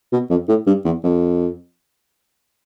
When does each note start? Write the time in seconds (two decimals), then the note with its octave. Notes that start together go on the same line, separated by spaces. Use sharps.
0.12 B2
0.30 F2
0.49 A2
0.67 G2
0.85 E2
1.04 F2